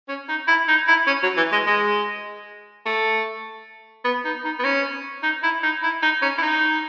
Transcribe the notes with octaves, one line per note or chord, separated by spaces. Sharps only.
C#4
D#4
E4
D#4
E4
C#4
F#3
E3
G#3
G#3
A3
B3
D#4
D#4
B3
C#4
D#4
E4
D#4
E4
D#4
C#4
E4
D#4